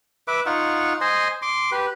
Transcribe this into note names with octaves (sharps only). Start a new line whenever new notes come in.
B4 E5 D6
D#4 F4 F#5 C#6
C5 D#5 G#5 C6
C6 D6
G4 B4